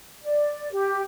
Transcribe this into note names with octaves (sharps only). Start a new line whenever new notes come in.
D5
G4